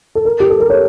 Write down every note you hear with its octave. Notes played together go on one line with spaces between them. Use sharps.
A4
A#4
G4
A4
A#4
C#5